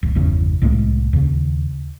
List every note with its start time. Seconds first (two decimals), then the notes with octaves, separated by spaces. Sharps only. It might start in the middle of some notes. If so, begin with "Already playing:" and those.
0.03 D1
0.15 G1 E2 C#3
0.62 C2 A2 G#3 A#3
1.13 D#2 C#3